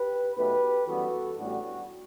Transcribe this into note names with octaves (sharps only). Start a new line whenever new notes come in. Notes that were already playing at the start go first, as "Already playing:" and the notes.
Already playing: G4 B4
B1 B2 A3 G4 B4
F#2 E3 G3 B3 F#4 A4
A1 A2 G3 B3 D4 F#4